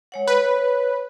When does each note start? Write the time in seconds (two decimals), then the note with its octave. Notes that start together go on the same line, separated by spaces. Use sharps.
0.12 G#3 C#5 F#5
0.27 B4 C#5